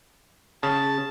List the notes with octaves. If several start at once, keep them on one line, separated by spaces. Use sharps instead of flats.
C#3 A5